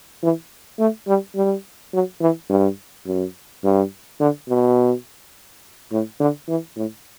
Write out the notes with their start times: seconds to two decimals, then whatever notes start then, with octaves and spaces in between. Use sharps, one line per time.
0.23 E3
0.79 A3
1.08 G3
1.36 G3
1.93 F#3
2.21 E3
2.50 G2
3.06 F#2
3.64 G2
4.20 D3
4.49 B2
5.92 A2
6.20 D3
6.48 E3
6.76 A2